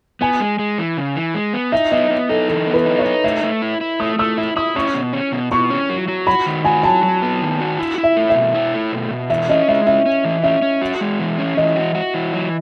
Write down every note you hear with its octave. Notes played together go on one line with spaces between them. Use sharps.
B3 G#5
G#3
G#3
E3
C#3
E3
G#3
B3
D#4 E5
B3 D#5
B3
D#4 A4
E3 A4
B3
B4
D#4
C#5
D#4
A3 E5
A3
E4
E4
A3 D#6
A3 E6
E4
E4 D#6
C#4 C#6
B2
C#4
B2
B2 C#6
C#4
F#3
F#3
F#4 B5
D#3
F#4 G#5
F#3 A5
F#3
B3
D#3
F#4
E4
E4
E5
A3
E5
B2
E4
A3
B2
B2
E3 E5
C#4 D#5
G#3 E5
C#4 E5
C#4
E3
C#4 E5
C#4
F#4
G#3
E3
C#4
E3 D#5
F#4
F#4
E3
F#3